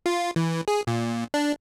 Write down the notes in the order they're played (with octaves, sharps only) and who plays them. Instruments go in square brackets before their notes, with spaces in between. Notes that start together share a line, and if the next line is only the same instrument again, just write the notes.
[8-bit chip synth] F4
E3
G#4
A#2
D4